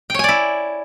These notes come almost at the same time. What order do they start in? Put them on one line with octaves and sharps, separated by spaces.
G5 C#5 G#5 D5 E4